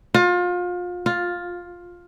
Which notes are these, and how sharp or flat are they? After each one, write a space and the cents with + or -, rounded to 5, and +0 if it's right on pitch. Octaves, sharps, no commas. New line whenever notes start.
F4 +30
F4 +10